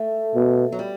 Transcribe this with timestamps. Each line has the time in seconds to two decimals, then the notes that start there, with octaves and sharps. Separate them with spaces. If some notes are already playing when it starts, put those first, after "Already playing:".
Already playing: A3
0.35 B2
0.72 F#3
0.79 G3